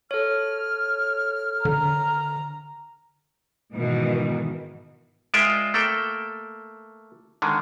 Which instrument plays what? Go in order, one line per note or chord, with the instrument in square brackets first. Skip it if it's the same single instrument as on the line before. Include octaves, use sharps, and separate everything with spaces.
[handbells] A4 C#5 [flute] F6
[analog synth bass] D3 [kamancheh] A#5
[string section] G#2 B2 D#3 E3
[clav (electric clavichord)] G#3 F4 A#4 D5 E5 G5
A3 A#3 A4 G5
D3 D#3 G#3